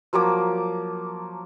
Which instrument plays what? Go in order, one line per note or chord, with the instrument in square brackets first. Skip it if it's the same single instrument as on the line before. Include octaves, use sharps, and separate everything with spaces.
[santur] F3 F#3 A#3 D6